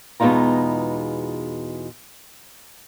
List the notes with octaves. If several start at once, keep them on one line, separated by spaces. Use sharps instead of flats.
E2 B2 G#3 D#4 F4 A#5